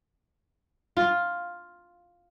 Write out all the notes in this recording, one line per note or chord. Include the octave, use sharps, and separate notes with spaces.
F4